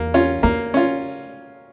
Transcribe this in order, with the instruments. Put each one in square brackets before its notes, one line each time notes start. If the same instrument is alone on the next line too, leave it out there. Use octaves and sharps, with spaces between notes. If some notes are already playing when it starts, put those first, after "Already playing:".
Already playing: [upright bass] E2 [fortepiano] A#3
[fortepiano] C#4 F4
[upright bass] E2 [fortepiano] A#3
[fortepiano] C#4 F4